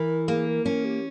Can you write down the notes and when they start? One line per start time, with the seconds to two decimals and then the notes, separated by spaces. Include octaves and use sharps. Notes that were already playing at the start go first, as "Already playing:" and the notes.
Already playing: E3 A#4
0.28 A#3 G#4
0.47 A#4
0.66 C#4 A#4
0.85 G4